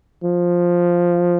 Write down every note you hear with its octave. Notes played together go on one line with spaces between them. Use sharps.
F3